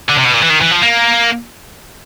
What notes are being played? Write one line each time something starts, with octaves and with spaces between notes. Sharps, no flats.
D3
C3
B2
A#2
E3
D#3
E3
F3
A#3